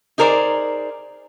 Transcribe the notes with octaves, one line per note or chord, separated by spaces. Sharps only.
D#4 G#4 A#4 C5 D5